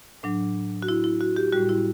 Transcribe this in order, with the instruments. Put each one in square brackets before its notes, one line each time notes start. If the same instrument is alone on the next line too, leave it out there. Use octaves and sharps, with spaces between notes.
[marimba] A2 F#3 D4
F#4
E4
E4
F#4
G4
A2 G3 F#4
E4